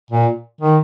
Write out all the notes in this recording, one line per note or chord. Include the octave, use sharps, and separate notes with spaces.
A#2
D#3